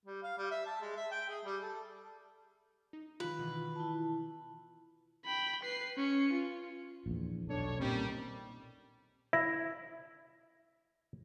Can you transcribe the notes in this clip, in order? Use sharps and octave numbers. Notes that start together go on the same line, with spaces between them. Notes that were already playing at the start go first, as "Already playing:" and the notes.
G3
F5
G3
E5
A5
G#3
E5
G5
G#4
G3
A4
D#4
D3 D#3 F4 B4
B2 E3
E4 A5
G5 B5
B4 C7
C#4 C#7
F4
A#1 E2
B1 B2 D4 A4 C#5
A#2 D#3 G3 C4 C#4
E4 E5